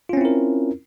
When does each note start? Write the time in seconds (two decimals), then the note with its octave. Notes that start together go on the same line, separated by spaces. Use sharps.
0.09 F4
0.13 C#4
0.17 C4
0.21 E4
0.25 A#4